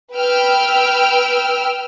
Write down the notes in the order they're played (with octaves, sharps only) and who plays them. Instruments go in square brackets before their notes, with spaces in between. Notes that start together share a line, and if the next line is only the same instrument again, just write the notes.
[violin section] B4 G5 E6 F6